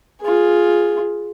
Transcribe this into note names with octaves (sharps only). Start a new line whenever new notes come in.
F4 G#4